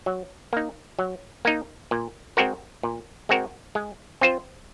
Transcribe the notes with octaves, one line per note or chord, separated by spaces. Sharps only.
F#3
A#3 D#4
F#3
A#3 D#4
A#2
G#3 C4 F#4 A#4
A#2
G#3 C4 F#4 A#4
G#3
C4 F4 C5